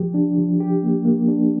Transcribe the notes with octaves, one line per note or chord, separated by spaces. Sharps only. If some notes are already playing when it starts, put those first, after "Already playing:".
Already playing: F3 G4
D4
F3
G4
A#3
A#3
D4